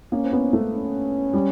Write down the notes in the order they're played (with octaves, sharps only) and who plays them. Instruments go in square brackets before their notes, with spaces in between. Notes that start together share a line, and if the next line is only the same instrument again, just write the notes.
[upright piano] A#3 [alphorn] C#4
[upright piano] C4
B3
A3
[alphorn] C#4
[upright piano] G3